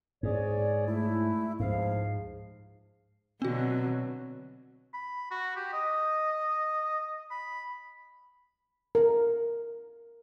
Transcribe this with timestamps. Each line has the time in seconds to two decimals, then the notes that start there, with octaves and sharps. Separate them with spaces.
0.23 G#2 G#4 C#5 D5
0.86 A3 E4
1.60 C#2 G#2 F3 F5
3.42 B2 D3 F#3 C4 F#4
4.94 B5
5.31 F#4
5.56 G4
5.73 D#5
7.31 B5
8.95 A#4